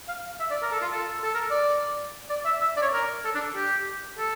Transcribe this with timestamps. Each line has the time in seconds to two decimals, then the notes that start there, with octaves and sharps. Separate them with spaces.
0.08 F5
0.40 E5
0.50 D5
0.62 A#4
0.72 A4
0.82 F4
0.92 A4
1.24 A4
1.34 A#4
1.51 D5
2.29 D5
2.45 E5
2.61 E5
2.76 D5
2.82 C#5
2.93 A#4
3.25 A4
3.35 D4
3.56 G4
4.18 A4